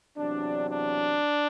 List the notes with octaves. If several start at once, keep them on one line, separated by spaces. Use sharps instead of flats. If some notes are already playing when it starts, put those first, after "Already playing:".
E2 C3 F#3 D4
D4